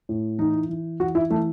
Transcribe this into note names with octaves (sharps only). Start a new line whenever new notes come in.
A2
E3 D#4
E3
E3 F#4
E4
E3 A3